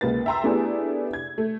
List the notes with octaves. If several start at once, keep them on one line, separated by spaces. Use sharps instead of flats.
C#2 A#3 B4 A6
E5 G5 A#5 C6 E6
A3 B3 D4 E4 G4 G#4
G#6
A3